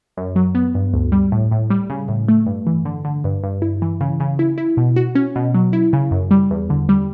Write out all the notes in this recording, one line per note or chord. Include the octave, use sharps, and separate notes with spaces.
F#2
F#3
B3
G2
D2
G3
A2
A2
G3
C#3
A2
A3
G2
E3
D3
D3
G2
G2
E4
E3
C#3
C#3
E4
E4
B2
F#4
C#4
B2
F#3
E4
C#3
F#2
G3
E2
D3
G3